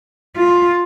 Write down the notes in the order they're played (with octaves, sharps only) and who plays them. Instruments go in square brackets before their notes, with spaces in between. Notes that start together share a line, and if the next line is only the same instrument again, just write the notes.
[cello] F4